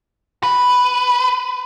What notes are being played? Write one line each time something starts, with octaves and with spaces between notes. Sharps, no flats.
B4